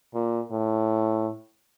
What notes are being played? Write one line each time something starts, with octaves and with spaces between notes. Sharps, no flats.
A#2
A2